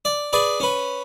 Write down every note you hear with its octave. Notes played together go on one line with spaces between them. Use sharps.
D5
G#4 B4 D5
C#4 B4